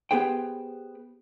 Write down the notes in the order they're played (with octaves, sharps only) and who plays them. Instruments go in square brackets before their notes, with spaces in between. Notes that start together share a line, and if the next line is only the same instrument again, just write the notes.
[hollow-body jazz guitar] B3 G4 G#4 C5 G5